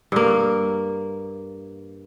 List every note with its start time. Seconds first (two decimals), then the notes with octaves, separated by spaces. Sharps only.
0.12 G2 A#3